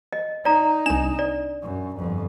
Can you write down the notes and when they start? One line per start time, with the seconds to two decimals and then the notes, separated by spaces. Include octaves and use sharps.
0.13 D#5
0.45 D#4 D5 A#5
0.86 C2 D4 E7
1.19 D5
1.63 F#2
1.97 G1 F2